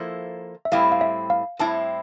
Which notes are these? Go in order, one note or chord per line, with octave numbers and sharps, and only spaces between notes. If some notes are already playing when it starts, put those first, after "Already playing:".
Already playing: F3 A#3 E4 A4 C5
E5
A2 G3 C4 E4 F5
F5
E5
F5
A2 G3 C4 E4 A5